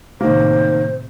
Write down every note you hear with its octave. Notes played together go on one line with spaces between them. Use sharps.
A2 C3 D#3 A#3 C5